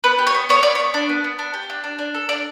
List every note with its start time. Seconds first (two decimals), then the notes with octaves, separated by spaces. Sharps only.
0.04 B3 B4
0.19 G4
0.27 C#5
0.34 B3
0.49 B3 C#5
0.63 B3 D5
0.75 C#5
0.80 B3
0.94 D4
1.09 B3
1.24 B3
1.39 D4
1.54 G4
1.70 D4
1.84 D4
1.99 D4
2.14 A4
2.29 D4 D5